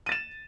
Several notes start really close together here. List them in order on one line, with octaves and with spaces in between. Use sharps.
D#7 A6 E7